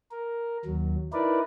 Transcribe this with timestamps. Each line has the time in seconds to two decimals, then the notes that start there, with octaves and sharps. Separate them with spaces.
0.11 A#4
0.65 D#2 F#3
1.13 D#4 E4 A#4 B4 D5